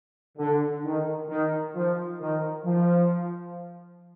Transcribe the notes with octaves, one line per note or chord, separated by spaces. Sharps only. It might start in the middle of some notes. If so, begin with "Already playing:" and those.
D3
D#3
D#3
F3
D#3
F3